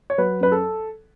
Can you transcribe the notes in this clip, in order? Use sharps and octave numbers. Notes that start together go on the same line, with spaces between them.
C#5
F#3 B4
F#2 B4
A4